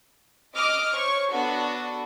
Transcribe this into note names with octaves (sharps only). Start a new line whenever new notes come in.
D#5 D6 D#6 F6
C5 C#5 C#6
B3 D4 F#4 A4